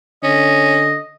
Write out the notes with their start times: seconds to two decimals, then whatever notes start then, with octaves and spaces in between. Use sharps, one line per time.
0.23 D3 C#4 D#5